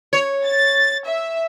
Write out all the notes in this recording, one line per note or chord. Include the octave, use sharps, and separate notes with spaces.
C#5
A6
E5